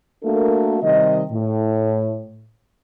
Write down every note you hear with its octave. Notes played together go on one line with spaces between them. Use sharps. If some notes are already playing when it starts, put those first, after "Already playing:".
A3 A#3 D4 F#4 A4 A#4
C3 D#3 G3 D#5
A2